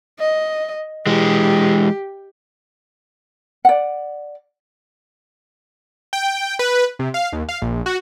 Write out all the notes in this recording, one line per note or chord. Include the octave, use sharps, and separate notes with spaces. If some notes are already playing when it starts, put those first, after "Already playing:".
D#5
E3 G#3 G4
D5 F#5
G5
B4
C3
F5
D#2
F5
A#1
F#4